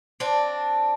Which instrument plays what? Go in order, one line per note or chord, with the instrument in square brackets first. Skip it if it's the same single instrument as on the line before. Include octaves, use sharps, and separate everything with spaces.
[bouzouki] C4 D4